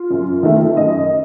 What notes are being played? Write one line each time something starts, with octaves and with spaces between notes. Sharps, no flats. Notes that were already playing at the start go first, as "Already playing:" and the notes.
Already playing: F4
F#2
D#3 A3
F#2 D#5